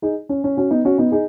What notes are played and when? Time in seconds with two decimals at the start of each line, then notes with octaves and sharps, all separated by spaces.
0.02 D#4 G#4
0.29 C#4
0.44 C#4
0.57 C#4 F#4
0.71 B3 D#4
0.85 C#4 F#4
0.98 B3 D#4
1.12 D#4 G#4